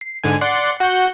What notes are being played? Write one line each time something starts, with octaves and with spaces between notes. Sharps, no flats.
C7
G#2 D3 G#5
D5 F#5 C6
F#4 F#5 G6